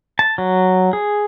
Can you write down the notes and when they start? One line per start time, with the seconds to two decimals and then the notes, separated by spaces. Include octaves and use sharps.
0.19 A5
0.38 F#3
0.93 G#4